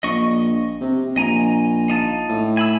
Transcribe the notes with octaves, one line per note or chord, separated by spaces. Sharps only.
A#1 D#5 C#6
C3
A#1 D#5 G#5 A#5
D#4 F4 A5
A2
G#5 B5 E6